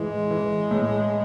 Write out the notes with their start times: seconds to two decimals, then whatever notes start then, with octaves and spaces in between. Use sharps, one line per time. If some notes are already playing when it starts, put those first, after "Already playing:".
Already playing: A2 E3 G#3
0.31 E3
0.71 A2